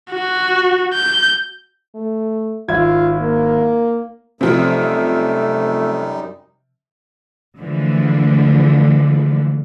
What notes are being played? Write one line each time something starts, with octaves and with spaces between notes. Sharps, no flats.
F#4
G6
A3
G#1 E4 F4 G#6
A#3
F#2 C3 F3 G3 A3 D#4
D3 E3 F3 G#3 A3